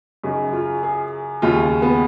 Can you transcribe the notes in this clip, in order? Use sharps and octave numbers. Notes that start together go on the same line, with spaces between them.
F#2 C#3 D#4
F4
G#4
D#2 C#3 F4
B3